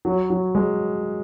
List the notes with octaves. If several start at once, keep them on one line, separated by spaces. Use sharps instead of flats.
F#3
F#3
G#3